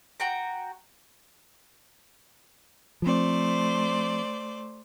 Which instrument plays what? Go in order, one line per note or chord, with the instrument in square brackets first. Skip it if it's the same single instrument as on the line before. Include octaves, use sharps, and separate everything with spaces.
[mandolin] F#4 G5 A#5
[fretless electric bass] F3 C4 [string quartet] A3 C5 D5